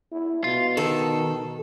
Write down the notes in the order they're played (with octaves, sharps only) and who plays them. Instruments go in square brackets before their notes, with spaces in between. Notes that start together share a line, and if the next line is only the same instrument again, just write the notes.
[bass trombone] E4
[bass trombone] B2 [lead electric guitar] F4
[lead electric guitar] D#3 [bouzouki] A4